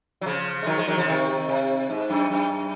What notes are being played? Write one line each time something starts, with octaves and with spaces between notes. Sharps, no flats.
F#3
C#3 F3
G#3
D#3 F#3
F3 G#3
D#3 F#3
C#3 F3
C3 D#3
C3
G#2
F#2
F#2